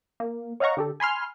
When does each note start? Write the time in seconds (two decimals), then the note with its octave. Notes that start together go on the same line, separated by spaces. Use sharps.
0.20 A#3
0.60 C#5 D#5 F5 F#5 A#5 C#6
0.77 D3 G4 A4
1.00 G#5 B5 C6 F6